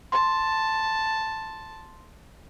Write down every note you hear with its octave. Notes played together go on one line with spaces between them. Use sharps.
A5 C6